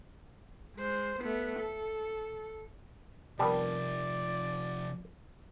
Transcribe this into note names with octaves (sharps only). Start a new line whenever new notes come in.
G#3 C5
A3 B3
A4
C3 F3 G3 B3 A#4 D5 A5